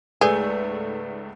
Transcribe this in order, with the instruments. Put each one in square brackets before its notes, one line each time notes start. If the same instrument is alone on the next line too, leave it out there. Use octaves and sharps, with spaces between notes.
[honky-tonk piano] C#2 G#2 A3 [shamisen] G#4 [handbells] B4 D5